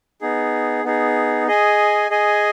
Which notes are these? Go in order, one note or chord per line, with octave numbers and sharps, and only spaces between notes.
B3 D#4 G#4
B3 D#4 G#4
G#4 D#5 G#5
G#4 D#5 G#5